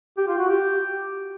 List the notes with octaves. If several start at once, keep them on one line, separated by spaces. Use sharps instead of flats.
G4
F4
F#4
G4